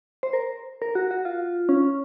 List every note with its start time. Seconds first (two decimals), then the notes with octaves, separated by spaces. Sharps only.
0.23 C5
0.33 A#4
0.82 A#4
0.95 F#4
1.11 F#4
1.25 F4
1.69 C#4